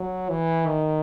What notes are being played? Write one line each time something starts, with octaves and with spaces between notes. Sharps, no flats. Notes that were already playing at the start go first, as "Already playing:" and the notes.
Already playing: F#3
E3
D#3